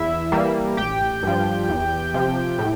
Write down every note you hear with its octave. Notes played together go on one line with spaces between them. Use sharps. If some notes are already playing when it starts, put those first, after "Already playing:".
Already playing: E2 E4 E5
E3 G3 A#3
A1 G4 G5
G2 F3
E2
C3 F3
A2